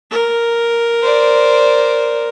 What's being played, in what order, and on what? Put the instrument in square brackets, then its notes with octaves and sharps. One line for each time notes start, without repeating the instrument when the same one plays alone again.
[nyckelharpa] A#4
[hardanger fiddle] C5 D5